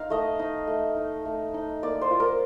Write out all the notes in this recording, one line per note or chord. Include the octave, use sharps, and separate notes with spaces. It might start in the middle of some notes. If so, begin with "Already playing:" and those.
Already playing: D#4 F5
A3 D#5
D#4
A3
D#4
A3
D#4
A#3 D5
C5
F4
A#4